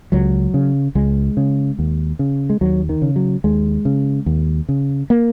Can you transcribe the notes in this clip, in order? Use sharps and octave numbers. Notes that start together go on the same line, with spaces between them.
C#2 F#3
C#3
C#2 G#3
C#3
D#2
C#3
G#3
D#2 F#3
D#3
C#3
F#3
D#2 G#3
C#3
D#2
C#3
A#3